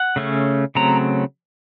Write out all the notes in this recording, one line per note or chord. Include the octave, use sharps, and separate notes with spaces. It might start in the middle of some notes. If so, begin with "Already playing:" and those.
Already playing: F#5
C#3 A3 C#4
C#3 F#3 A3 C4 A#5